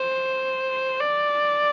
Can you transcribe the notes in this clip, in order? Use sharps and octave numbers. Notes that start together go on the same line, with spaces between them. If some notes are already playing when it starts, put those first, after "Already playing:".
Already playing: C5
D5